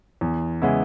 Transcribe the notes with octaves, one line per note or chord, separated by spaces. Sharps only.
E2
C#3 G#3 B3 E4